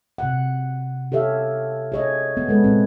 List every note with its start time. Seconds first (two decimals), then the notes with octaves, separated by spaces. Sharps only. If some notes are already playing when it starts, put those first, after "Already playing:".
0.18 C3 F#5
1.12 G4 A4 C#5 E5 F5
1.92 G#4 C#5 D#5
2.37 B3
2.49 G#3 A4 B4
2.64 A#2 C4